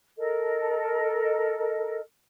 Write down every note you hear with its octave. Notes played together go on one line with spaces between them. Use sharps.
A4 A#4 D#5